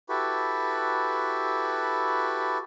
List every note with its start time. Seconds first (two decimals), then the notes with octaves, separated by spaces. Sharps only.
0.09 E4 F#4 G4 A4 B4